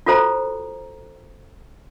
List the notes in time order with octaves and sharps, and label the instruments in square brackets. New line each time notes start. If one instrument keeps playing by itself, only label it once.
[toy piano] F4 F#4 A4 C5 A#5